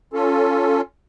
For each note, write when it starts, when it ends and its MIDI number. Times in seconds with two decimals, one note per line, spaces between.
0.13 0.81 61
0.13 0.81 65
0.13 0.81 69